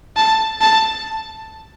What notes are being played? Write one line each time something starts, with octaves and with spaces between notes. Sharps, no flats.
A5
A5